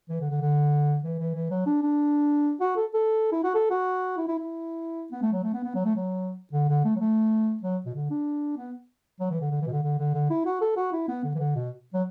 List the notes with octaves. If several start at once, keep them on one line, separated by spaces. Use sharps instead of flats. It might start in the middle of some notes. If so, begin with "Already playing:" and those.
E3
D3
D3
D3
E3
E3
E3
F#3
D4
D4
F#4
A4
A4
E4
F#4
A4
F#4
E4
E4
E4
B3
A3
F#3
A3
B3
B3
F#3
A3
F#3
D3
D3
A3
F#3
A3
F#3
B2
D3
D4
B3
F#3
E3
D3
D3
E3
B2
D3
D3
D3
D3
E4
F#4
A4
F#4
E4
B3
D3
E3
D3
B2
F#3